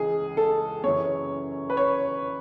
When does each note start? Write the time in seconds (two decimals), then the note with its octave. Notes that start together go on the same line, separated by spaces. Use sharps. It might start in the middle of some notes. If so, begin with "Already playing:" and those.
Already playing: C#2 C#3 E3 G#4
0.37 A4
0.83 F#2 C#3 E3 C#5
1.70 B4
1.77 C#5